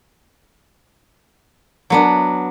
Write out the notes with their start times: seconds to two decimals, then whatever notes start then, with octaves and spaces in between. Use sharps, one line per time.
1.90 F#3 B3 D4